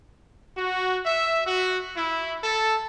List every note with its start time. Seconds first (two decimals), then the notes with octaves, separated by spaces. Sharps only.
0.57 F#4
1.06 E5
1.47 F#4
1.97 E4
2.44 A4